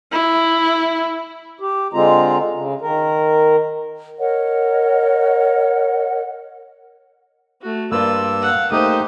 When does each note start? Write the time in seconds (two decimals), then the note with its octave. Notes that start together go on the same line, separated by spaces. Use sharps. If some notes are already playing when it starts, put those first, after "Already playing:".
0.12 E4
1.60 G4
1.93 D3 G#3 C4 F4 A#5
2.55 C#3
2.81 D#3 A#4
4.18 A#4 C#5 D#5 F#5
7.61 A3 F#4
7.92 G2 A#3 F4 B4 C5 D5 E6
8.42 F5 F#5
8.72 A3 A#3 D#4 G4 C5 D#6